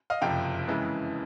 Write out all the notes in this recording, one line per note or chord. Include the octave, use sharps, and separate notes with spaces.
D#5 F5
F#1 F2 C3 F3 F5 G5
F2 C#3 E3 G#3